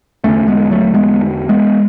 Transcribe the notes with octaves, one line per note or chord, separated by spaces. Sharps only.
E2 D3 A3 C#4
G#3 B3
F#3 A3
G#3 B3
G#3 B3